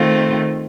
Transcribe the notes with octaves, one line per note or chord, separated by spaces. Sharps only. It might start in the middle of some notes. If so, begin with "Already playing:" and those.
Already playing: D#3 A3 C4 F4